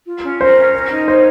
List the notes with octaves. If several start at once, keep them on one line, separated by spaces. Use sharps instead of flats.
F4
C#4
A#4 C5
C#4
A#4
D#4
C5 C#5